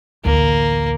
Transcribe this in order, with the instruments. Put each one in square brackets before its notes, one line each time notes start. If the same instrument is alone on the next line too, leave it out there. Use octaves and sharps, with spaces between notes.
[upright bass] A1 D2 [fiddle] A#3